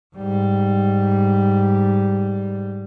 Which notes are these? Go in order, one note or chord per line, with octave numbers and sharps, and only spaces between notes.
G#2 G3